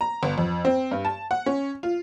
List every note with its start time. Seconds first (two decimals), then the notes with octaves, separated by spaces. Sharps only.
0.01 A#5
0.23 G1
0.38 F2
0.65 C4
0.91 G2
1.05 A5
1.31 F#5
1.46 C#4
1.83 F4